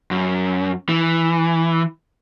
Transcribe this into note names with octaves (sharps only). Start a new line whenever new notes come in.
F#2
E3